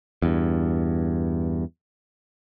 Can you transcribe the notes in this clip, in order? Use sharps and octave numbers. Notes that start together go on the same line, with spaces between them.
E2 G2